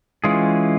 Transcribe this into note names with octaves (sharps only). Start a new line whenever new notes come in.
E3 G#3 C#4 F4 G#4